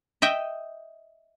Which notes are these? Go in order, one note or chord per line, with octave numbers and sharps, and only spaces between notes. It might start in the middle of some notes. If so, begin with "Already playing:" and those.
D#5 E5 G5